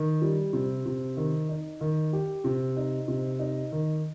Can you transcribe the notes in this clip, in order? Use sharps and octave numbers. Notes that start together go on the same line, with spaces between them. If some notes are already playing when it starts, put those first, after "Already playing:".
Already playing: D#3
G3
C3
C3
D#3
D#4
D#3
G4
C3
D#4
C3
D#4
D#3